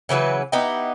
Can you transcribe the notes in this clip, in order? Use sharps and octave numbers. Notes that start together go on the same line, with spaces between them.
C#3 E3 F#3 B4
B3 D#4 E4 G4